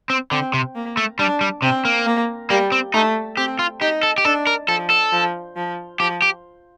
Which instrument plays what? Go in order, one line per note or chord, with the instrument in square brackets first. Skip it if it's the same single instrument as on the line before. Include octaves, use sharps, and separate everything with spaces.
[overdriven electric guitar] C4
[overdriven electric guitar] D3 [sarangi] C4
[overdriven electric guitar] C3
[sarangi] A#3
[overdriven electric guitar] A3
[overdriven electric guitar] G3 [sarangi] D4
[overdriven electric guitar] G3
[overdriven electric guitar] C3 [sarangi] C4
[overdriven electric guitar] A#3
[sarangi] A#3
[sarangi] G3 [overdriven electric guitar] A#3
[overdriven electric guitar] C4
[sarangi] A3 [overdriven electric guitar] D#4
[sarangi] C4 [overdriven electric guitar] G4
[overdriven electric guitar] F4
[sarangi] D#4 [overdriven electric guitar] G4
[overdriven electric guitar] A4
G4
[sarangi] D4 [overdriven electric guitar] A4
[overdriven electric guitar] A#4
[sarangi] F3 [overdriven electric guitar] A4
[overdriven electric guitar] A4
[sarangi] F3
F3
[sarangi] F3 [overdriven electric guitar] G4
[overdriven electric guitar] G4